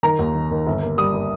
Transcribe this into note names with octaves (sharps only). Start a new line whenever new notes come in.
D#3 A#5
D#2
D#3
D#3
G1
A#3
G3 D#6
A#3